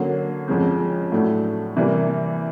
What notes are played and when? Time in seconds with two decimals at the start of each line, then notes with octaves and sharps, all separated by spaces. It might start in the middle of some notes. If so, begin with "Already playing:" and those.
Already playing: D3 F#3 A#3 C#4
0.48 F2 C#3 F3 G#3 C4
1.12 A2 F#3 A3 D4
1.76 C3 E3 G3 A#3